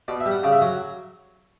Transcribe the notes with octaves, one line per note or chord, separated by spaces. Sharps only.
B2 D5
E5
G3
F#5
C#3 D5
E5
F#3 F#5